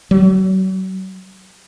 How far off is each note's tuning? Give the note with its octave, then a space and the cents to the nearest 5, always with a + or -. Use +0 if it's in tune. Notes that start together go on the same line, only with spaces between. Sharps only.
F#3 +35